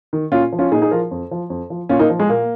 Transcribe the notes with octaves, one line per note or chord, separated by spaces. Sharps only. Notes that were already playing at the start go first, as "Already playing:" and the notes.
D#3
A#2 C#4 F4
F3
C#4 F4
A#2 D#4 G#4
D#4 G#4
F3 F4 A#4
F2
F3
F2
F3
A#2 C#4 F4
A#3 D#4
F3
G#3
A#2 A#3